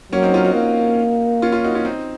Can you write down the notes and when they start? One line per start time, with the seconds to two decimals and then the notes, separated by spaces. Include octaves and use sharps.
0.12 F#3 A#3 C#4
0.23 C4 D#4
0.34 C#4 F4
0.45 D#4 F#4
0.55 A#3
1.42 C#4 F4
1.52 C#4 F4
1.64 D#4 F#4
1.75 C#4 F4
1.85 C4 D#4